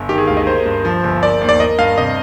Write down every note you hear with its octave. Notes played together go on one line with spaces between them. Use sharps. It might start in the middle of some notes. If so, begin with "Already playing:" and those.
Already playing: G1
D#3 G4
G#4
D2 F5
D#5
A#3 C5
G2
F3
G1
A#3 D5
D#2
D5
A#3 D#5
G2 F5
C3 D#5